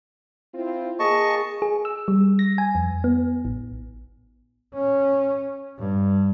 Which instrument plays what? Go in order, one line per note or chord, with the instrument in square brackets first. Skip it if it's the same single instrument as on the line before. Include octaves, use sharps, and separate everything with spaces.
[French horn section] C4 E4 F4
[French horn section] A#3 G#4 [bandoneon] D#5 A5 C#6
[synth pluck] G#4
E6
G3
A#6
G#5
F2
B3
A1
[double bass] C#4
G2